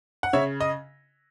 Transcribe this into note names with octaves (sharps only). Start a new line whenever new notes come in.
F#5
C#3 C#5 E5
D#5